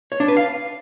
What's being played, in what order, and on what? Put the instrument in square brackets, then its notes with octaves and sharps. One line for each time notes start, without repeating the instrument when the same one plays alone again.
[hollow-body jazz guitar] C#5
D4
B4
F5